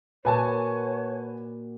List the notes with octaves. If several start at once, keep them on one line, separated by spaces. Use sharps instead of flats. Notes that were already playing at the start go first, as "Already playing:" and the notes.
A#2 F#4 B4 C#5 G#5 A5